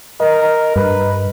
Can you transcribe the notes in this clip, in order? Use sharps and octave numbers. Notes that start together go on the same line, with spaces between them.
A#4 D#5
G2 B4